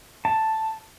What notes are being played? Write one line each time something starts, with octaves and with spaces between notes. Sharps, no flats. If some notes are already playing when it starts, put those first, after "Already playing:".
A5